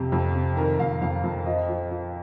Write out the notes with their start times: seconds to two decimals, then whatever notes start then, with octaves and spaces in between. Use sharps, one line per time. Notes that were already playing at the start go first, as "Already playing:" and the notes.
Already playing: F2 C3 G4
0.12 F2
0.35 C3
0.57 D#3 A#4
0.79 F2 F5
1.01 F2 F5
1.24 F2
1.46 F3 D#5
1.69 F3
1.91 F3